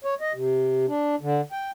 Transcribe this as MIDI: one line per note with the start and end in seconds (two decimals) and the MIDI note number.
0.04 0.14 73
0.21 0.32 75
0.34 0.86 48
0.88 1.15 62
1.21 1.41 50
1.52 1.71 79